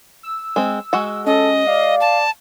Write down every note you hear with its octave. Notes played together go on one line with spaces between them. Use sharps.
E6
G#3 C4
G#3 F#4 F#5
C#4 A4 D#5
D5 F5
A5